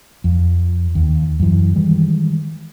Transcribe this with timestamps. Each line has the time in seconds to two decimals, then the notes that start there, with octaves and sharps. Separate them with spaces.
0.24 F2
0.95 D#2
1.40 F#2 E3
1.76 D#3 E3 G3 G#3